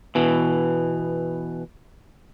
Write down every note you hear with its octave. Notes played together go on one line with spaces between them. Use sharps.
B2 E3